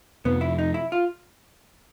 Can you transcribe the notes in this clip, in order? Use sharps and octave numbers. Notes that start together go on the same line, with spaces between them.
F2 C3 F3 B3
E4
D#4
E4
F4